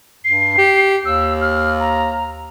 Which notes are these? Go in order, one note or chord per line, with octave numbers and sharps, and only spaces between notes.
G2 C7
G4
D#2 E6
F6
A#5